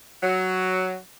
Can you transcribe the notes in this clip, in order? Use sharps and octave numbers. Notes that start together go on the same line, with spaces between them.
F#3